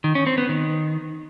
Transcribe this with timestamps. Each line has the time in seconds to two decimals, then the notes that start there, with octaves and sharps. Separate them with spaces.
0.04 D#3
0.15 C#4
0.27 C4
0.38 B3
0.49 D#3